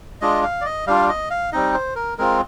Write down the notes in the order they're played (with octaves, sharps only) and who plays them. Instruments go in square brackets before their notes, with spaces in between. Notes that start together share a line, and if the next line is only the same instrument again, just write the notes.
[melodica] G#3 D4 F4 D#5
F5
D5
D#5
G3 D4 F4 F5
D#5
F5
G3 C4 D#4 D#5
C5
A#4
G#3 C4 F4 A#4